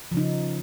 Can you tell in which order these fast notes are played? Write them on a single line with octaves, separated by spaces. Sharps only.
F3 C#3 D#4